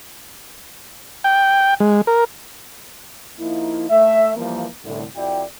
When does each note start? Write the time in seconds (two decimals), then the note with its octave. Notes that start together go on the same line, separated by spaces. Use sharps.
1.24 G5
1.80 G#3
2.07 A#4
3.39 F3 A#3 D#4 E4
3.89 A3 E5
4.36 E3 F3 G3 A#3
4.84 C2 A2 D3
5.15 F2 E4 F#4 D5 G5